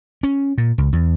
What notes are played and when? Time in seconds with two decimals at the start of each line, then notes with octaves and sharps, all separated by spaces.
0.23 C#4
0.58 A#2
0.78 C#2
0.93 E2